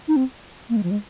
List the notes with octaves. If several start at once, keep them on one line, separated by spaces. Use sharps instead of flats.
D#4
C4
A#3
G#3
F3
G#3